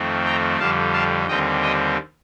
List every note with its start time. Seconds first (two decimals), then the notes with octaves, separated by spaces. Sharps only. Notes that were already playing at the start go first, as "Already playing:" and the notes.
Already playing: F2 D#3 A3 C4
0.25 G5 A#5
0.59 F2 D3 G3 F5 A5
0.93 F5 A5
1.28 D#2 D3 G3 C4 D#5 G5
1.62 D#5 G5